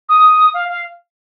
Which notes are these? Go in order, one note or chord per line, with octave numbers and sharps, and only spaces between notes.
D#6
F5
F5